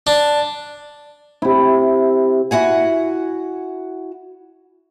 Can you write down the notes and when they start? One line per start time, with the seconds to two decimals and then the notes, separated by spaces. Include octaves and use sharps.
0.07 D4
1.42 C3 E4
2.51 E4 F#4 F#5 G#5